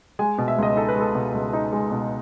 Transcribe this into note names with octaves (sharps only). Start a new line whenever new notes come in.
G#3 G#5
B2
E5
C#2 D#5
D#4 A4
B4
G#3 A4
B2
C#2
D#4
G#3
B2